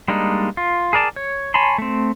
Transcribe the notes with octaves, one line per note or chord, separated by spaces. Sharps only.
G3 G#3 A#3 D4 D#4
F4
G#4 A#4 D5 A5
C#5
C#5 G#5 A5 B5 C6
A3 C4